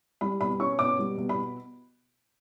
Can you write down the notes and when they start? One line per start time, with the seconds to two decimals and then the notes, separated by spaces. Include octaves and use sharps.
0.21 G3 B5
0.41 B2 B5
0.60 C#4 C#6
0.79 B2 D6
0.99 G3
1.17 B2
1.29 B5